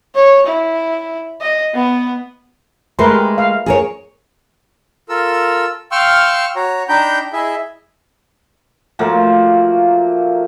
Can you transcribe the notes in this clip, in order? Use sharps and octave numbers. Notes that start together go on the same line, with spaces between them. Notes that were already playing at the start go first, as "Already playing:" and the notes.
C#5
E4
D#5
B3
G#3 A3 A#4 B4 C6
G4
F5
G#4 A#4 C#5
F4 A4 A#4 E6
F5 G5 C6 C#6 E6 F6
F#4 C#5 A#5
D4 D#4 G5 A#5 B5 G6
E4 G#4 D#5 E5
F3 F#3 A3 A#3